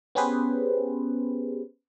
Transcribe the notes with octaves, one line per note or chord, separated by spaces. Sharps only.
B3 C#4 G4 G#4 B4 C5